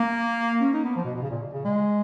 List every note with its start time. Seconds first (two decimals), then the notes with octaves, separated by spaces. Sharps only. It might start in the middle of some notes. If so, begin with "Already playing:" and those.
Already playing: A#3
0.61 C#4
0.73 D#4
0.85 B3
0.96 F3
1.05 B2
1.15 B2
1.22 C#3
1.30 A#2
1.53 C#3
1.65 G#3